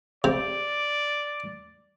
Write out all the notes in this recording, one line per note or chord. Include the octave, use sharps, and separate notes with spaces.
C3 D5